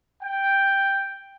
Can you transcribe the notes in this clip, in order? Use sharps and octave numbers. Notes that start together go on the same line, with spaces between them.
G5